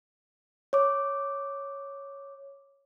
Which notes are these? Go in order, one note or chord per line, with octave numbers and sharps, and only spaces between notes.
C#5 D6